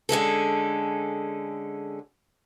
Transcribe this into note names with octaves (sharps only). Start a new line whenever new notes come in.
D3 G#3 C#4 A4